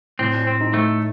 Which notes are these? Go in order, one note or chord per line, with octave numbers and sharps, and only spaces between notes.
A2 C4
C4
D#4
A3